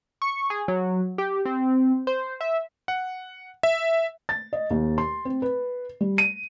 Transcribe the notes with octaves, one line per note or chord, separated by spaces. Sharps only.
C#6
G#4
F#3
G4
C4
C5
E5
F#5
E5
A6
D#5
D#2
C6
C4
B4
G3
D#7